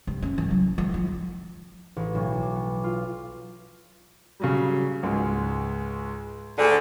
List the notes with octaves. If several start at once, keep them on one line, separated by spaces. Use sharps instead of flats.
G2
C#4
E3
F#3
F3
F4
A1
B1
D6
B3
F4
C#3 F#3 G3
C#2 G#2 G#3
D2 D3 G#4